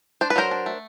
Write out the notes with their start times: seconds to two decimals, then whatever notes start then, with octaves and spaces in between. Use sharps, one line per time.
0.21 D4 C5
0.30 B4
0.36 F#3 A#4 C5
0.51 D4
0.66 A3